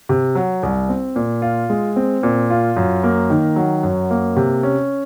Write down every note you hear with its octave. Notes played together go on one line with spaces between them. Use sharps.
C3
F#3
C2
C4
A#2
F4
G#3
C4
A#2
F4
F#2
A#3
D#3
F#3
F#2
A#3
C3
C#4